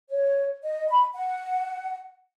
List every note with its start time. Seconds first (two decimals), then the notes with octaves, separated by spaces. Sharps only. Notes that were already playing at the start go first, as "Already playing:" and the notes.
0.10 C#5
0.63 D#5
0.89 B5
1.14 F#5